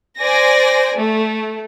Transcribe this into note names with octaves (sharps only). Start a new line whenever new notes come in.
C5 D5 G#5 A#6
A3